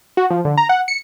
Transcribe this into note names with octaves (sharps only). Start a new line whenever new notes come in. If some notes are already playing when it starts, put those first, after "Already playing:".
F#4
F3
D3
A#5
F#5
C#7